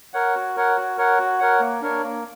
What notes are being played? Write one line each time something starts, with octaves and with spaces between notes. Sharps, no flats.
A#4 C#5 F#5
F#4
A#4 C#5 F#5
F#4
A#4 C#5 F#5
F#4
A#4 C#5 F#5
A#3
D4 A#4 C#5
A#3